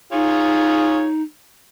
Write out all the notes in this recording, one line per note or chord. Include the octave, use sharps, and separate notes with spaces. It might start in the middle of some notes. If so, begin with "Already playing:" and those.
D#4 F4 G#4 C#5